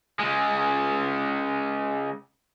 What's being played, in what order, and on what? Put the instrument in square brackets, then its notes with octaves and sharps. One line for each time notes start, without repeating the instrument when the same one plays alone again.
[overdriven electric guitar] C#3 G#3